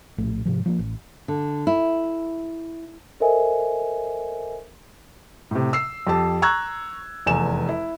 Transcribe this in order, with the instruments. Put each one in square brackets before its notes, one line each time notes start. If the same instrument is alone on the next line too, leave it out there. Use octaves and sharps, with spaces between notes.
[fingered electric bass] A#1 A2 A3
G#2 C3 F3
F3 G#3 A#3
A1
[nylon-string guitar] D3
E4
[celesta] A4 A#4 C5 D#5 E5 G#5
[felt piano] A2 C3
E6 C7
F2 G4 A5
A#5 C#6 E6 F#6 G#6
F1 E2 G#5 E7
E4